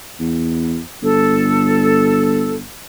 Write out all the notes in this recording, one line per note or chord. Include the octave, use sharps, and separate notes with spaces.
E2
G1 A4